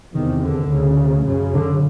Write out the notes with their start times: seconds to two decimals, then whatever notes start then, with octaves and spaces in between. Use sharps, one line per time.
0.13 E2 C3 D#3
0.42 D3
0.70 D2 C#3
1.26 F#2 C#3
1.54 D3